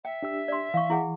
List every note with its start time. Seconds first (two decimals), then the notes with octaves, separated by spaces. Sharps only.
0.05 E5 G5
0.23 D4 G4 E6
0.48 D5 C6
0.74 E3 F5 C#6
0.90 E4 G#4 F#5